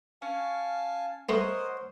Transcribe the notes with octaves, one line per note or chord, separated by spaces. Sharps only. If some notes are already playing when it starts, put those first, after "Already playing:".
C#4 F5 G#5 A5
G#3 A3 B3 A#4 C5 C#5 D#5 F#5